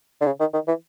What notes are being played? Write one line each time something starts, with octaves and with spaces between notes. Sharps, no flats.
D3
C#3
D#3
D#3
E3